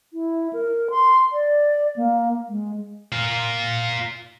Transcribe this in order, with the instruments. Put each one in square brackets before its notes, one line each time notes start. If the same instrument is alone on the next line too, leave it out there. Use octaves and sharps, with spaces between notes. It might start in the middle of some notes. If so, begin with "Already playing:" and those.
[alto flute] E4
A#4
C6
D5
A#3
G#3
[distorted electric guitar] F4 A#4